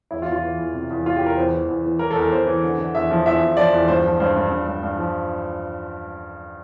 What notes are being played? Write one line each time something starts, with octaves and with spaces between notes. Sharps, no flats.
E2 E4
F4
E2
F4
E3
E2
C3
E2
E3 F4
G4
E2
A#4
E2 C5
E3
E2
E3
E3 A#4
A4
E2
A#4
E2 C5
E3
D3
D3
E2 E5
F3
E2 E5
E2
F3 D5
E2
G2 C5
F3
G2 C5
G2
G2
G2
G2
F3